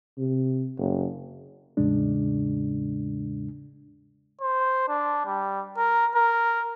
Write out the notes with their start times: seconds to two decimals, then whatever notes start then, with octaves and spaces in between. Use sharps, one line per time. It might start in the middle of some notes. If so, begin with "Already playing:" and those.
0.18 C3
0.78 F#1
1.77 E2 A2 C#3 G#3 D4
4.42 C5
4.88 D4
5.26 G3
5.77 A#4
6.15 A#4